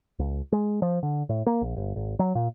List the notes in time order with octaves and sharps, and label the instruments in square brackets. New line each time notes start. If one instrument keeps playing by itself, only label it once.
[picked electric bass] C#2
G#3
F3
D3
A2
A#3
A#1
G1
G#1
F#3
A#2